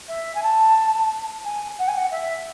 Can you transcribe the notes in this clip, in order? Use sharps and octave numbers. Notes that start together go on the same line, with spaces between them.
E5
G#5
A5
G#5
F#5
G#5
F#5
E5